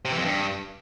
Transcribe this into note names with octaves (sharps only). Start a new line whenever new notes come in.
C3
E3
F2
G2